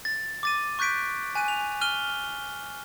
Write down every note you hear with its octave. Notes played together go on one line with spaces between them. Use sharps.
A6
D6 A6 D#7
C#6 F#6 G6 B6 D7
G#5 F#6 D#7
F7
F6 D#7 G7